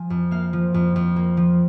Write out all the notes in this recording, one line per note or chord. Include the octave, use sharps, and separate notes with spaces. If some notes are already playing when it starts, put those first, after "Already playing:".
Already playing: F3 G#5
F2
A#3 F5
F3
F2
F2
A#3
F3